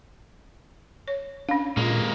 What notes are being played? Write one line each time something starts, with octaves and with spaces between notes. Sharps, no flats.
C#5
C#4 D4 F5
A#2 G#3 A#3 F4